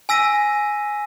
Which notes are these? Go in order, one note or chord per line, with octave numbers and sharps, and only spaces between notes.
G#5 E6 A#6 B6 D#7